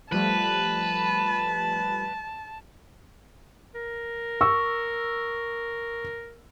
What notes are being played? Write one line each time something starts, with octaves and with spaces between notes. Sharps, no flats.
F3 G3 A3 B4 A5
A#4
C#6 E6